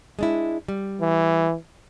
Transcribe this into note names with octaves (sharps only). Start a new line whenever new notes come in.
G#3 D4 E4
G3
E3